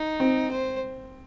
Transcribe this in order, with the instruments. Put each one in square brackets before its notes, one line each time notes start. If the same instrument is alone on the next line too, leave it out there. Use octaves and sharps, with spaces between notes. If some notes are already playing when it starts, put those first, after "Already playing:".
Already playing: [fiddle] D#4
[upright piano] C4
[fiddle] C5